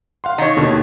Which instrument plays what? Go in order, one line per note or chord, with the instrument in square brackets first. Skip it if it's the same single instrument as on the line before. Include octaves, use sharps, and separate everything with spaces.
[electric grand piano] F5 F#5 C6
[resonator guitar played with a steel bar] D#3 C#5 [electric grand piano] D#5 A#5
[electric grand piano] D#2 B2 D3